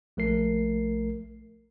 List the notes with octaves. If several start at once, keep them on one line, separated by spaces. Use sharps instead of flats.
A#1 A3 A#4 C7